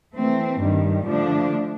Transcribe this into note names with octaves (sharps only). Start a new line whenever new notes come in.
E3 A3 C4
G2 D#3 G3
D3 F3 A3 D4